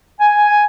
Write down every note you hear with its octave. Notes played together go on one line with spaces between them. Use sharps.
G#5